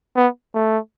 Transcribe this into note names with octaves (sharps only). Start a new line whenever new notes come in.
B3
A3